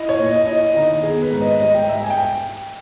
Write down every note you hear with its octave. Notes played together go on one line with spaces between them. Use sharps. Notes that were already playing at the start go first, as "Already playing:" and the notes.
Already playing: E4 D#5
C#5
A#2
D#5
E4 D#5
D#3 D#5
B3 G#4
B4
G#2
D#5
G3 D#5
G5
G#2 E5
G#5
G5